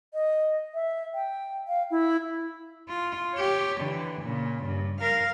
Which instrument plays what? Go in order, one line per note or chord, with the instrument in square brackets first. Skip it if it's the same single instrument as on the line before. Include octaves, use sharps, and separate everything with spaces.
[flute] D#5
E5
G5
F5
E4
[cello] F4
G4 C#5
D3 E3
A#2 C#3
G2
A#4 F5